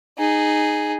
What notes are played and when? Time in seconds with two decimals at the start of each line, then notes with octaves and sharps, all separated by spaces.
0.18 D#4 G#4